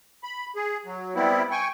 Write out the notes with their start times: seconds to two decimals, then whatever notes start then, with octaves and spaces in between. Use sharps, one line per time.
0.24 B5
0.56 G#4
0.85 F#3
1.15 G3 B3 C4 E4
1.51 G5 G#5 C#6